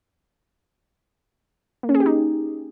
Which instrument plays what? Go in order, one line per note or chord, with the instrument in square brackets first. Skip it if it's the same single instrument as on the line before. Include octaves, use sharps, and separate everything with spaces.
[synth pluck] A#3
C#4
G#4
G4
D#4